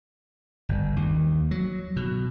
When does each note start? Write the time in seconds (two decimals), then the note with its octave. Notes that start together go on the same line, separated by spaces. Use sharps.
0.69 G1
0.96 D#2
1.51 F#3
1.96 B2